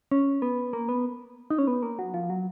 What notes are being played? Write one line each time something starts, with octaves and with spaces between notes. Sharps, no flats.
C#4
B3
A#3
B3
D#4
C#4
B3
A#3
F#3
F3
F#3